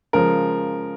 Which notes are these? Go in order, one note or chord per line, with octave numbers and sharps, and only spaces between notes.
C#3 F3 G#3 A#4